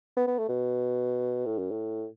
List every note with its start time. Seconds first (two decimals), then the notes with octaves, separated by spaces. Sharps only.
0.17 B3
0.27 B3
0.38 A3
0.48 B2
1.46 A2
1.58 F#2
1.71 A2